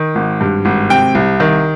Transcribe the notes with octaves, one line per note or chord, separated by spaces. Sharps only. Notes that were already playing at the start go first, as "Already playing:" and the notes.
Already playing: D#3
G#1
G2
G#1
C3 G5
C2
D#3